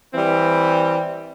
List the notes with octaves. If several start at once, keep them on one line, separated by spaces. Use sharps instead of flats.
E3 G3 C4